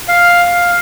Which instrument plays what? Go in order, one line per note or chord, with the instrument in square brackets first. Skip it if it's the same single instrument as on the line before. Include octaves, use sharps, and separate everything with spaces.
[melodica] F5